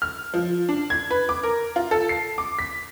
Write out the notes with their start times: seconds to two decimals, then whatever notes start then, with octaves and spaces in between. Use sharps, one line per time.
0.02 F6
0.34 F3
0.69 D4
0.90 G#6
1.11 B4
1.29 D6
1.43 A#4
1.76 F4
1.91 A4
2.09 C7
2.38 D6
2.59 B6